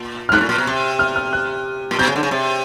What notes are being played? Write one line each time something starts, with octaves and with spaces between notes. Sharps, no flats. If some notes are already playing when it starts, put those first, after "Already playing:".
Already playing: A#2
F6
G#2 F#6
A2
A#2
B2
C3
F6
F6
F#6
A#2
B2 G6
C#3
D3
C#3
C3